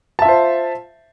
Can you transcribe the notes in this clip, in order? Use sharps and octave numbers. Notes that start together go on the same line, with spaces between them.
F4 C5 E5 A5